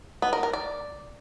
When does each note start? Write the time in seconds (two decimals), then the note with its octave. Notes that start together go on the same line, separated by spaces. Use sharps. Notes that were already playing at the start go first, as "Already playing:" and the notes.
0.22 B3
0.33 A#4
0.43 A#4
0.53 D5